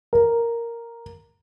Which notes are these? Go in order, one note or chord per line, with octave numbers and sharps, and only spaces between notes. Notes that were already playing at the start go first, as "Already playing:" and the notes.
A#4